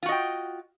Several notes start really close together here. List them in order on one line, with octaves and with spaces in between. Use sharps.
F4 F#4 D#5 G5